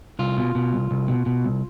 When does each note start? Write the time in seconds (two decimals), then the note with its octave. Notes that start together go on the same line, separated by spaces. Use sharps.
0.19 C2 F4
0.37 B2
0.55 B2
0.73 C2
0.91 C2
1.08 B2
1.26 B2
1.44 C2